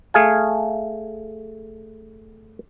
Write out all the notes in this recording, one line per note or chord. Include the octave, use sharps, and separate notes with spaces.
A3 G#4 F5 G#5